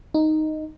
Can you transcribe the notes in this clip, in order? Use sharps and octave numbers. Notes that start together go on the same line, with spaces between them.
D#4